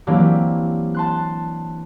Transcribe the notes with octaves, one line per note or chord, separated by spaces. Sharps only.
E3 F#3 A#3 C4 D4 G4
A5 C6 F#6